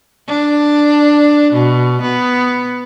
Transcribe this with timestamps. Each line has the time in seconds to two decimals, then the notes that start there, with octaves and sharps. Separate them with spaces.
0.27 D4
1.53 B2
2.02 B3